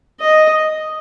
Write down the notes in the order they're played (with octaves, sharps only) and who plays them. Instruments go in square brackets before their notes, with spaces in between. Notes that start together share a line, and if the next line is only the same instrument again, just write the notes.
[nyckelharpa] D#5